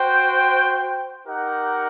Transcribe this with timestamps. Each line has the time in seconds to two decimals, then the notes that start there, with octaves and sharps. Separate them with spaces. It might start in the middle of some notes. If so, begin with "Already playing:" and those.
Already playing: F#4 C5 G5
1.26 D#4 G4 A#4 F#5